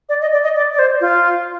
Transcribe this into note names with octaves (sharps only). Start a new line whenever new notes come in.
D5
D#5
D5
D#5
D5
D5
C5
F4